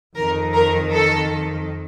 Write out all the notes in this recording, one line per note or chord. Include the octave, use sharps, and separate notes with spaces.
F2 D#3 A#4
A#4
A4